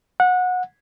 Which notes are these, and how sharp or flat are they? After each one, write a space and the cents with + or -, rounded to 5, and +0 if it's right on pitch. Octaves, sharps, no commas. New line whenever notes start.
F#5 -20